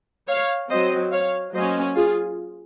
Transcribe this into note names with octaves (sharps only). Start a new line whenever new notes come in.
C#5 F5
F#3 C4 C5 D#5
C#5 F5
F#3 A#3 C#4 C5 D#5
F4 G#4